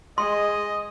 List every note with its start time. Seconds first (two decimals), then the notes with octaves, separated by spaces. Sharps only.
0.18 G#3 D#5 C6